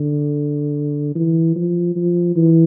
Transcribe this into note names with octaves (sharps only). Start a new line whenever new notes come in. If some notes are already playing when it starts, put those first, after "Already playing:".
Already playing: D3
E3
F3
F3
E3